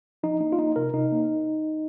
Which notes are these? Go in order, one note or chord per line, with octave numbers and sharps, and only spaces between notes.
F3 D#4
A#3 D#4
F4
A#3 D#4
C3 A#4
C3 D#4
A#3